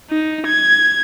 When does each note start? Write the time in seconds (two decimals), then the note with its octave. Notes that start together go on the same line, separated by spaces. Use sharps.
0.10 D#4
0.47 G#6